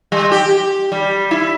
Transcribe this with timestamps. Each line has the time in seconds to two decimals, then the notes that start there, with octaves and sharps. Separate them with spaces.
0.12 G3
0.31 G4
0.92 G3
1.31 E4